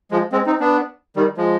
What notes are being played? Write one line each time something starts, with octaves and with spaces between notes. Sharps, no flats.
F3 G#3
G#3 C4
C4 D#4
B3 D4
D#3 G3
F3 G#3